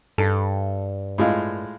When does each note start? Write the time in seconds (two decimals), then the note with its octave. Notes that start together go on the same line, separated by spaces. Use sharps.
0.18 G2 A4
1.18 A2 G#3 F4